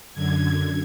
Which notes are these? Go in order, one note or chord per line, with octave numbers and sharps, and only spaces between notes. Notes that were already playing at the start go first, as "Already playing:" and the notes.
F#2 D3 G#6